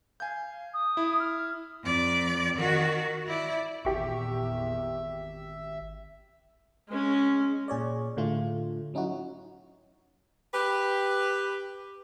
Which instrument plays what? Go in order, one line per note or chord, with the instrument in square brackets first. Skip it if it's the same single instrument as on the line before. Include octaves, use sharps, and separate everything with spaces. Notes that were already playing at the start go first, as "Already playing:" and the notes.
[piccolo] F5 [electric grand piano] G#5 G6
[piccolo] D#6
[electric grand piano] E4
[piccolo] F6
[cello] F2 D5
D#3 F#4
E4 D5
[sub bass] G#1 [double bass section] E2 A#2 [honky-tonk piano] G4 C#6 [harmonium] E5
[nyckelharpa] G#3 C#4
[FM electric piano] A#2 G#4 C#5 D5
A2 D3 A3 F4
F#3 C#4 D#4 E4 F#4
[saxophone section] G4 B4